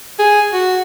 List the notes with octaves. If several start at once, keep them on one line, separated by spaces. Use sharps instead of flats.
G#4
F#4